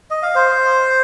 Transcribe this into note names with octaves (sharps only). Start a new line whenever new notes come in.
D#5
F5
C5